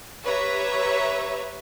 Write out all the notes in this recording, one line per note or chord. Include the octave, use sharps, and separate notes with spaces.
G4 B4 C#5 E5 A#5